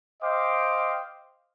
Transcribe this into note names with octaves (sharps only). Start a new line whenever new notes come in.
C5 D#5 F5 G5 D6